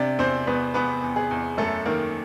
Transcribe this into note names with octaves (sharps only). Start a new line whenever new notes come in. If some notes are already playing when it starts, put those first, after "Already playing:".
Already playing: C3 D4 D5
E2 C4 C5
E2 B3 B4
E2 B3 B4
E2
G#4
E2
F#2 A3 A4
D#3 A#3 A#4